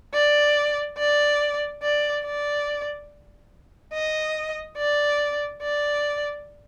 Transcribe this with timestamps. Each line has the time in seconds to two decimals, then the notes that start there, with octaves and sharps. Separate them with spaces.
0.14 D5
0.98 D5
1.83 D5
2.25 D5
3.93 D#5
4.78 D5
5.62 D5